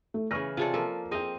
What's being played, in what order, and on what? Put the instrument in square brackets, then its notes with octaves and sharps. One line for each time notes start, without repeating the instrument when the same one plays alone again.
[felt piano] A3
[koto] C#3 E3 [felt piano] C#6 F6 A#6
[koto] C3 A4 [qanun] F4 G#4 D5
[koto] F3 A#3 [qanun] A4
[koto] C4 D#5 F5 [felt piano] G#4 G5